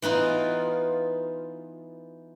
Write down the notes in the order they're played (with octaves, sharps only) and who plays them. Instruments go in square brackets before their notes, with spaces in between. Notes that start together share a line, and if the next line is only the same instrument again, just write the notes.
[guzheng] E3 B3 D#4 F4